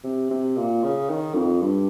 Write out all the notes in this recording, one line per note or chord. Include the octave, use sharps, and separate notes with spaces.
C3
C3
A#2
C#3
D#3
F2
G2